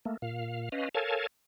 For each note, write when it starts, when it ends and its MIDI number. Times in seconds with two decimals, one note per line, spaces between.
0.05 0.17 57
0.05 0.17 58
0.22 0.69 46
0.22 0.69 77
0.72 0.89 61
0.72 0.89 71
0.72 0.89 75
0.72 0.89 77
0.95 1.27 69
0.95 1.27 70
0.95 1.27 73
0.95 1.27 77
0.95 1.27 80
0.95 1.27 81